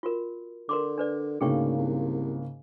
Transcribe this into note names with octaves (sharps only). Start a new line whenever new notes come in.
F4 F#4 A#4
D3 A#4 C6 D6
D4 B4 D5
D2 G#2 C#3 A#3 G#4 G5 C#6
C2